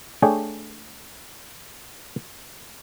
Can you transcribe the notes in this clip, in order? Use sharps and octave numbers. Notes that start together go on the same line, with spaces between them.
A3 D4 G#4 C#5 G5